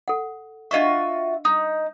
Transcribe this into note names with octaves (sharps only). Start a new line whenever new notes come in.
A4 F#5
D4 F4 F#4 D#5 E5 C#6
D#4 D#6